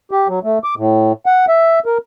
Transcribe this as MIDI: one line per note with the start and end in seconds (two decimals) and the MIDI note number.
0.11 0.28 67
0.28 0.39 54
0.43 0.59 57
0.64 0.75 86
0.77 1.12 45
1.26 1.46 78
1.48 1.79 76
1.86 1.98 70